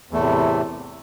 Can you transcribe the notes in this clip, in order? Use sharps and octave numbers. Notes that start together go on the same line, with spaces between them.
E2 A2 C3 A3